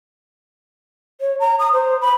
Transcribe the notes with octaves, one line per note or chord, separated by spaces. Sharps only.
C#5
A#5
D#6
C5
B5